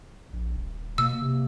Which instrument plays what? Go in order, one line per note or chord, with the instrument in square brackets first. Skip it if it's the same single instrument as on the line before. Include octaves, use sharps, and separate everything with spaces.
[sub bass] A#1
D#1
[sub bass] B2 [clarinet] A#3 [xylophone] E6
[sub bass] C3